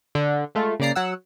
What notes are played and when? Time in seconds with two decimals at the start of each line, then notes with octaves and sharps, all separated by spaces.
0.15 D3
0.55 G#3 A3 F4
0.80 C#3 A#3 D5 A#5 C7
0.95 F#3 F#5 E6